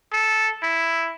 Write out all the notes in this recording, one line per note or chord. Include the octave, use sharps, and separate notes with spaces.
A4
E4